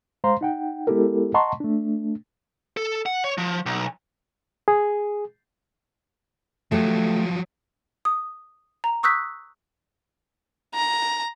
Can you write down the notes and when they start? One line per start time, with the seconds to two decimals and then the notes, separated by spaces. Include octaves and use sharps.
0.24 G#3 C5 F5 A#5 C6
0.41 D#4 F#5 G5
0.87 G#3 B3 E4 G4 A4 A#4
1.34 D#5 F#5 A5 A#5 C6 C#6
1.60 A3 D4
2.77 A4
3.06 F#5
3.24 C#5
3.38 F3
3.66 B1
4.68 G#4
6.72 F3 F#3 A3 G4
8.05 D#6
8.84 A#5
9.03 C#6 D#6 E6 F#6 G6 B6
10.75 A#5